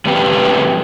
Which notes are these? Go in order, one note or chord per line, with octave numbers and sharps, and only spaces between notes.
F3 G3 A3 C4 G4 B4